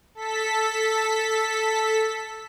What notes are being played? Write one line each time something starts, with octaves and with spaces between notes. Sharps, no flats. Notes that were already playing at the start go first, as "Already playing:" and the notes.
A4 B6